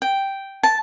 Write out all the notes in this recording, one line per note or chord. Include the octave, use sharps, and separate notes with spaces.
G5
A5